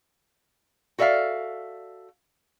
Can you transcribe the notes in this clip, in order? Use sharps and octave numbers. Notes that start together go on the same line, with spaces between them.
F#4 A4 D5 E5 F5